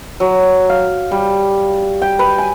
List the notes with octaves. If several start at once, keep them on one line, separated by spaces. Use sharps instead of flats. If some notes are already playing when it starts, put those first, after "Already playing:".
F#3
F5
G3
G5
B4
G#5